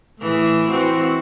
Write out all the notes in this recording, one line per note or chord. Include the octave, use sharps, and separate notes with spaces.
A2 E3 G#4
E3 C4 F#4